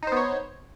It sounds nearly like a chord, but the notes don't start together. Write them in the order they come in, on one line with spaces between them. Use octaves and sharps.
D#4 C5 B3 C#5